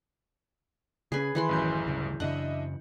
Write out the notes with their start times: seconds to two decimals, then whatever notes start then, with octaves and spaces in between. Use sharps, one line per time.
1.12 C#3 C#4 G#4 B4 G#5
1.35 D#3 E3 B4 C6
1.49 A1 F#2 G6
1.87 D2 G2 C#3
2.20 F#2 C#3 D4 D#5 E5 F#5